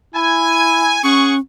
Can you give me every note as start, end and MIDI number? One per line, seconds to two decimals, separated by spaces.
0.14 0.98 64
0.14 1.02 80
1.03 1.39 61
1.03 1.34 68
1.03 1.34 78
1.03 1.34 85